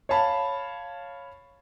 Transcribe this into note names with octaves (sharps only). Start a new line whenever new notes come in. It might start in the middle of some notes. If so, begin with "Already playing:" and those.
C#5 F5 A5 B5